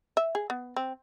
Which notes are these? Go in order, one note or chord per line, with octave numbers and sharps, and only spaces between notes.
E5
G#4
B3
C4